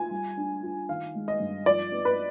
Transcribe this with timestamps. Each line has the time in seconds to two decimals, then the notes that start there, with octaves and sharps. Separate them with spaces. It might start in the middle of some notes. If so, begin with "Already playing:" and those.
Already playing: F4 G#5
0.11 G3
0.37 D4
0.63 F4
0.89 D#3 F5
1.15 G#3
1.28 D#5
1.40 G2
1.66 F3 D5
1.92 B3
2.05 B4